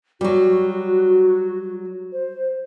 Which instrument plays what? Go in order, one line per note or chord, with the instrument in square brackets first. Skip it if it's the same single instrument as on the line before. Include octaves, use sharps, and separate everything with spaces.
[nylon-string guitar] F#3 G3 [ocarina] F#4
[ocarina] C5